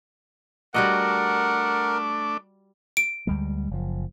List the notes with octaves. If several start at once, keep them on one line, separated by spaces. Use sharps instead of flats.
G3 A3 D4 F#4 A#4 D#5 F#5 D6
D7
D2 G3 G#3
F#1 F3